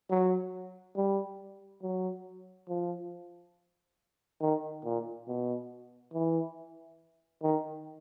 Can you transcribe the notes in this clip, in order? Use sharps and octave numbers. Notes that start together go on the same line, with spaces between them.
F#3
G3
F#3
F3
D#3
A#2
B2
E3
D#3